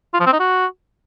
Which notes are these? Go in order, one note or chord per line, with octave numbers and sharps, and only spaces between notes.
F4
F3
C4
D#4
F#4